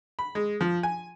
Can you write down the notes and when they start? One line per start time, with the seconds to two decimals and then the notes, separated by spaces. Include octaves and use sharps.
0.19 B5
0.35 G#3
0.61 F3
0.83 G#5